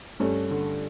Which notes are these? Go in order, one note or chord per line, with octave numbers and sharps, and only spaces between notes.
G2 A3 C#4
D3